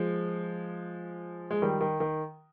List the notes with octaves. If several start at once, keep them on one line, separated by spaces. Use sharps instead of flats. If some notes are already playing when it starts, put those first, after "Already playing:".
Already playing: F3 G#3
G#3
D#3 G3
D#3
D#3